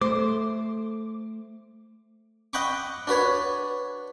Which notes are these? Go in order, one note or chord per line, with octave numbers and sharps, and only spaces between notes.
A3 C5 D6
D#5 F#5 G5 B5 C#6 D6
D4 F#4 B4 C#5